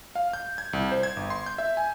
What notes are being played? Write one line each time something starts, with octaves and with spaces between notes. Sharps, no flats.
F5
G6
G#6
C2
C5
G#6
G1
C6
G6
E5
G#5